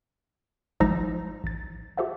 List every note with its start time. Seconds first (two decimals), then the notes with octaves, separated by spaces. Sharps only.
0.80 G#1 F3 G#3 D#4 E6 A#6
1.44 A1 A6
1.97 F#4 G4 A4 C5 E5 F#5